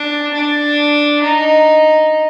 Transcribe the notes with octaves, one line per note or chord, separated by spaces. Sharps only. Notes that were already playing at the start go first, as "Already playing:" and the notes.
Already playing: D4
D4
D#4